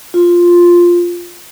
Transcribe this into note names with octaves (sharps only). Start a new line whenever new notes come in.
F4